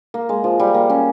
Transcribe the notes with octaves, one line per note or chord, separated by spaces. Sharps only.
A#3
G#3
F3
G3
A#3
C#4